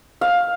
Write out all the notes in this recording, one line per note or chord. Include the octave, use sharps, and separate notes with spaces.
F5